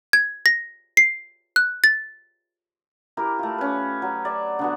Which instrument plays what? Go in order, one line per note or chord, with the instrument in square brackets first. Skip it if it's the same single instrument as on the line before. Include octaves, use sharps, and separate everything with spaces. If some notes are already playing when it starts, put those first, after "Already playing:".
[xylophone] G#6
A#6
C7
F#6
A6
[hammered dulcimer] E4 G4 A#4
A3 F4
C#4 B4
F#3
D5 E5
D3 B3 F#4